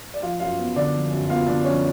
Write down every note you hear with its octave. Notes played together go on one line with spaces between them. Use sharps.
D5
F3 F4 F5
F#2 F4 F5
B3
D3 D4 D5
F3
F#2
B3 F4 F5
D3 D4 D5
F3 C#4 C#5